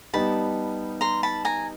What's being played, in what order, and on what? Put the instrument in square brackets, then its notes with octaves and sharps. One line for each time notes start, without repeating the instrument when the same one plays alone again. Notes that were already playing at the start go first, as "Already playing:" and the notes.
[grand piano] G3 B3 D#4 [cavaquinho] A5 B5
[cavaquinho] A#5 C6
A5 B5
G#5 A#5